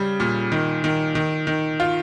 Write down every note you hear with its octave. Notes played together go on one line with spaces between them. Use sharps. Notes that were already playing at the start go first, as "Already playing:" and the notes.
Already playing: C#3 G3
A#2
D#3
D#3
D#3
D#3
F4